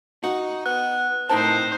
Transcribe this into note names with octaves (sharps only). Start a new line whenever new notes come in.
D#4 F#4
B3 F#6
A2 C4 D#4 A#4 C5 A5